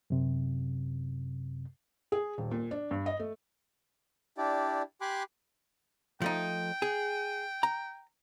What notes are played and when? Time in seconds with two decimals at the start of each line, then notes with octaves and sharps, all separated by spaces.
0.10 F#2 C3
2.12 G#4
2.38 D#1
2.51 A#2
2.71 D4
2.91 G2
3.06 D#5
3.20 A3
4.38 D4 E4 G4 D5
5.01 G4 G#5 B5 C6 D6 F#6
6.22 F3 A3 D#4 G5
6.82 G#4
7.63 A#5